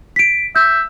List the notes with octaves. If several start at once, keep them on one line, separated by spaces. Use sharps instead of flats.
B6 D7
E5 G6